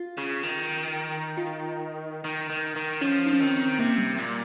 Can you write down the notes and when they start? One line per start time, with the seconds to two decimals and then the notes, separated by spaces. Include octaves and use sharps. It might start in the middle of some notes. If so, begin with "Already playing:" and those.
Already playing: F4
0.18 C#3
0.43 D#3
1.37 F4
1.47 D#4
2.24 D#3
2.50 D#3
2.76 D#3
3.01 F3 C#4
3.26 D#4
3.33 C#4
3.40 D#3 C4
3.79 C3 A#3
3.98 G3
4.18 A#2 G3